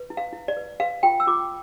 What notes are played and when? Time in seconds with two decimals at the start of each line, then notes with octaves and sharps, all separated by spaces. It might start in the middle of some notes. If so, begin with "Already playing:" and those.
Already playing: B4
0.10 E4
0.17 F5
0.33 E4
0.48 D5
0.57 B4
0.80 B4 F5
1.03 F4 G5
1.20 E6
1.27 F4 D6